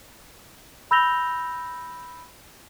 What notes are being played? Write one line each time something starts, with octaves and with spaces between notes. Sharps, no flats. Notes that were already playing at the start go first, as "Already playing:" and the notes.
B5 E6 G6 A#6 F7 G7